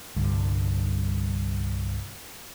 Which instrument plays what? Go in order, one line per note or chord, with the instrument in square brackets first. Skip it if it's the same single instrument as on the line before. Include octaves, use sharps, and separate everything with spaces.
[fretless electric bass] C2 G2 D3